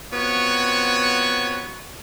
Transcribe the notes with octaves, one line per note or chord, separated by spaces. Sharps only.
B3 C4 F4 F#4 C#5